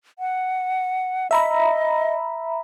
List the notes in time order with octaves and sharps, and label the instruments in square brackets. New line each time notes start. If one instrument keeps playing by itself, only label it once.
[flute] F#5
[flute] D#5 [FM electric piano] E5 A#5 B5